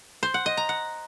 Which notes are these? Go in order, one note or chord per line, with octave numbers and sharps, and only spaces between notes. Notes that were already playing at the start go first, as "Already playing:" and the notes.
C5
F#5
D#5
A#5
F#5